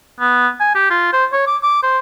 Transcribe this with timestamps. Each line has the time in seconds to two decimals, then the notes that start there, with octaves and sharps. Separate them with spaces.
0.20 B3
0.60 G#5
0.75 G4
0.90 F4
1.13 C5
1.33 C#5
1.47 D6
1.63 D6
1.83 C5